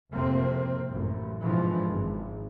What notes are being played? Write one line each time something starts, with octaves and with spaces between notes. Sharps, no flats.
F#1 F2 A2 C3 A#3 C4
A1 F#2
G#2 B2 D3 E3 F3
G#1